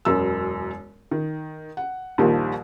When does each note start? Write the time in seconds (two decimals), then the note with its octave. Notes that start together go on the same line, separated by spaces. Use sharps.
0.05 E1 F#2 E6
1.11 D#3
1.77 F#5
2.18 A#1 D#2 D#3 F3 G3